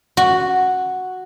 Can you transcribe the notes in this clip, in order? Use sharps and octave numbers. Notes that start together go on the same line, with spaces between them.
F#4